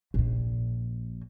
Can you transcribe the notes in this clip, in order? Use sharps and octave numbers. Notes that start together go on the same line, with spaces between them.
A#1 A#2